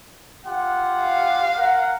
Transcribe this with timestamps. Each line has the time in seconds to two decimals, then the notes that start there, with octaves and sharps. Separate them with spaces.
0.45 F4 G4 F#5
1.03 F5
1.57 A#4 F#5